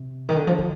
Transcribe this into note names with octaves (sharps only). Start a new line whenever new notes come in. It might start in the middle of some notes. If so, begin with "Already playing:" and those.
Already playing: C3
D#3
D3
F3
E3